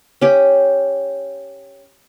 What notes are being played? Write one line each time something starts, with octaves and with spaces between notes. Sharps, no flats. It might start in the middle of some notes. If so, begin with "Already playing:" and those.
C#4 G4